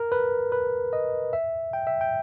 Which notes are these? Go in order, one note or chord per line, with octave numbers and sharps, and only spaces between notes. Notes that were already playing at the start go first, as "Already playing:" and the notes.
Already playing: A#4
B4
B4
D#5
E5
G5
E5
G5